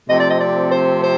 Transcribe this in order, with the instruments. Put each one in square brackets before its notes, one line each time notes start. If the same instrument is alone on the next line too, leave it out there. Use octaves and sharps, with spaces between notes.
[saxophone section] C3 F3 A3 C4 D#5
D5
D#5
D5
C5
C5